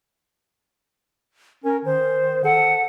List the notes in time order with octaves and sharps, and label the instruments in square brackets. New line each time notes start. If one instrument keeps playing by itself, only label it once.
[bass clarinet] C#4 [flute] A#4
[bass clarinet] D#3 [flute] C5
[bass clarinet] A4 [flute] F#5